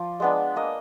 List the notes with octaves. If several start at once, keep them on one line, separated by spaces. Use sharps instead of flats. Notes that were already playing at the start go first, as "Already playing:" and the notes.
Already playing: F3 D5
G#3 B3 D4
A#3 D#5